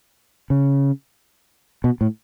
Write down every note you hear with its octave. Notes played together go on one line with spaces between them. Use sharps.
C#3
B2
A2